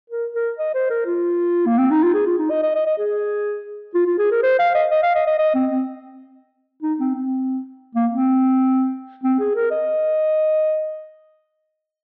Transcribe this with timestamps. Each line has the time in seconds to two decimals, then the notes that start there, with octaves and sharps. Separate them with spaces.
0.10 A#4
0.35 A#4
0.58 D#5
0.74 C5
0.90 A#4
1.06 F4
1.66 A#3
1.78 C4
1.90 D#4
2.03 F4
2.14 G#4
2.26 F4
2.38 D#4
2.50 D#5
2.63 D#5
2.75 D#5
2.86 D#5
2.98 G#4
3.95 F4
4.06 F4
4.18 G#4
4.31 A#4
4.43 C5
4.59 F5
4.75 D#5
4.91 D#5
5.03 F5
5.15 D#5
5.27 D#5
5.39 D#5
5.55 C4
5.71 C4
6.83 D#4
6.99 C4
7.15 C4
7.95 A#3
8.12 C4
9.23 C4
9.40 G#4
9.56 A#4
9.71 D#5